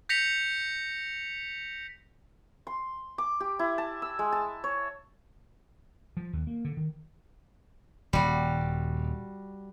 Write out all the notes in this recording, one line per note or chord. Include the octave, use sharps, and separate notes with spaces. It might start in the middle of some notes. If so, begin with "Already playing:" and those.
G6 A#6 B6 C#7 F7
C6
D6
G4
E4
A5
E6
G#3
A5
C#5
F3
D#2
A#3
D3
D#3
D#1 G3 F#4